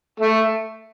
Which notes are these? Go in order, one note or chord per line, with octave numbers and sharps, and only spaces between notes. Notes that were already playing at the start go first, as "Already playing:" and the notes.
A3